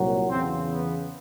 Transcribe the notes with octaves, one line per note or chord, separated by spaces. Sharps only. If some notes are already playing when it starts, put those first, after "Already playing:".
Already playing: C2 A#2 F#3
E2 C#3 E3 C4
B3